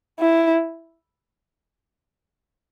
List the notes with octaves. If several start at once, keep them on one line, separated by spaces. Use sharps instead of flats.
E4